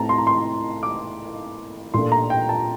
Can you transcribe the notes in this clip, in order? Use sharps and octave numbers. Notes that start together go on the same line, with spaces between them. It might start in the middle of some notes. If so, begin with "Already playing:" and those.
Already playing: A2 A3 C4 A5 A#5
C6
A#5
C6
D6
A#2 A3 D4 C6
A#5
G5
A5